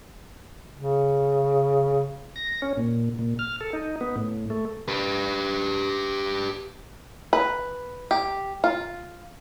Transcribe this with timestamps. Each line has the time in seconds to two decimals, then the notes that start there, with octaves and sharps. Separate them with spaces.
0.76 C#3
2.36 A#6
2.62 C#4
2.77 A#2
3.19 A#2
3.39 F6
3.61 A4
3.73 D#4
4.01 B3
4.16 A2
4.50 A3
4.88 G4 B4
7.33 B4
8.11 G4
8.64 F4